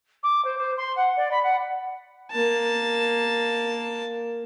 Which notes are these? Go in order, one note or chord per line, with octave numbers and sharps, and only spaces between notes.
D6
C5
C5
C6
F#5
D5
B5
F#5
A#3 A5